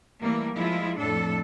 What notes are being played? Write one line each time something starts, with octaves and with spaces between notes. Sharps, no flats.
E3 G3 A3 A#3
F3 G#3 E4 F4
F2 A2 D4 A4